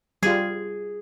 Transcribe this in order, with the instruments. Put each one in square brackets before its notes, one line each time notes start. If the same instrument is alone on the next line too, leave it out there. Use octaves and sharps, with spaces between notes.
[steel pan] G3 F4 [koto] G#4